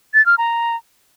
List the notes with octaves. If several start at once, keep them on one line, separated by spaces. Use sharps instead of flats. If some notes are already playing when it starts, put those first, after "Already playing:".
A6
F6
A#5